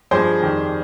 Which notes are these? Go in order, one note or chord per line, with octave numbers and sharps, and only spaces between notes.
G2 F3 G#3 G#4 C5
F2 D#3 G3